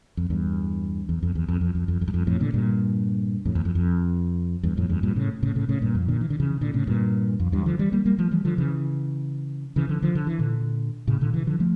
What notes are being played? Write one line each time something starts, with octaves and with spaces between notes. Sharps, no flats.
F2
E2 G2
E2
F2
E2
F2
F2
F2
F2
F2
G2
F2
F2 A2
A#2 D3
G2 A#2
F2 A2
E2
F2
F2
E2 G2
F2 A2
E2 G2
G2 A#2
A2 C#3
A2 C#3
A2 C#3
A2 C#3
G2 A#2
F2
A#2 D3
E3
D3
C#3 E3
A#2 D3
A2 C#3
G2 A#2
F2
E2 G2
D3 F3
E3 G3
G3 A#3
G3 A#3
F3 A3
E3 G3
D3 F3
C#3 E3
C#3 E3
D3 F3
D3 F3
D3
E3
A#2 D3
A2 C#3
A#2 D3
C#3 E3
D3 F3
F3 A3